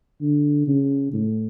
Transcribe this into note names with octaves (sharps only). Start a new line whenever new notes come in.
D3
C#3
A2